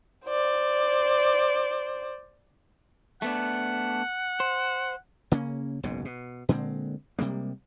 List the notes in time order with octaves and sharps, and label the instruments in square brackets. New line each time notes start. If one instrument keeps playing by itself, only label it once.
[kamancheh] C5 D5
[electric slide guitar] A3 B3 D4 [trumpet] F#5
[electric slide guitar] C5
[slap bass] C#3 A#3 C4 C#4
F#1 B1 G#2 B2
B2
A#2 D3 G#3 C4
C3 G3 G#3 A#3